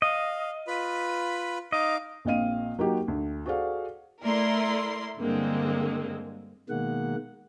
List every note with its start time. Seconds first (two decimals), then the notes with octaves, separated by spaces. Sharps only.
0.02 D#5 F5
0.67 F4 B4 B5
1.72 D#4 D#5 F5 D6
2.25 A#1 A#2 C4 D#5 F5 D#7
2.78 F#3 A#3 D#4 F#4 G4
3.08 D2
3.46 F#4 G#4 A4 C5 D5 F5
4.24 A3 E4 A#4 D5 C6
5.17 G2 D3 G#3 A#3 C4
6.69 B2 D#3 G#3 A#3 F#5